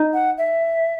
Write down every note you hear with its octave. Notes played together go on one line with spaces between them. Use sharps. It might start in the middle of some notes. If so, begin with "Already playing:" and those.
Already playing: D#4
F#5
E5